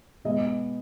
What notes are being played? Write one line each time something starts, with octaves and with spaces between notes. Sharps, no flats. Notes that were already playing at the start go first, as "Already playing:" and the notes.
B2 G#3 B3 D#5